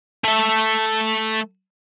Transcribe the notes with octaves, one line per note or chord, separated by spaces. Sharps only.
A3 E5